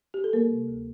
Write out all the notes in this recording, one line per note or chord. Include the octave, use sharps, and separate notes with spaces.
G4
A4
G3 A#3 A#4
C3
D2